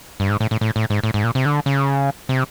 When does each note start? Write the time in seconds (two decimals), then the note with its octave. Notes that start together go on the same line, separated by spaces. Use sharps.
0.20 G2
0.30 G#2
0.40 A2
0.51 A2
0.61 A2
0.76 A2
0.90 G#2
1.04 A2
1.14 G#2
1.24 A#2
1.35 C3
1.45 D3
1.66 C#3
2.29 C3